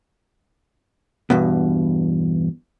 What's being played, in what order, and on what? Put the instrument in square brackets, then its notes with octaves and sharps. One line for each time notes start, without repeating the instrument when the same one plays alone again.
[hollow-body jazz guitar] E2 G2 B2